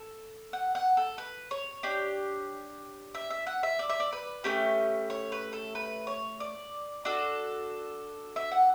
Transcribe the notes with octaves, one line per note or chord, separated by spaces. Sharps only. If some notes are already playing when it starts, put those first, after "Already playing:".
Already playing: A4
F#5
F#5
A4
B4
C#5
D4 G4
E5
E5
F#5
E5
D5
E5
D5
B4
A3 C#4 G4
C#5
B4
A4
B4
C#5
D5
D4 F#4 A4
E5
F#5